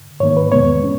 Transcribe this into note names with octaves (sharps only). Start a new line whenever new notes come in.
G#2 D#3 A#3 C#5
B4
E2 B2 G#3 B3 C#5
C#4